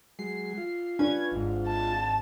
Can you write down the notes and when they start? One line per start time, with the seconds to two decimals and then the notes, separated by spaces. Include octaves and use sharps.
0.19 F#3 G#3 C7
0.58 F4
0.99 C#4 D4 B4 G#6
1.32 G#1 G#2
1.68 A5